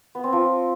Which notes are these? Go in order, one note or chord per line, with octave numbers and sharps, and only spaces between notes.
B3
C4
F3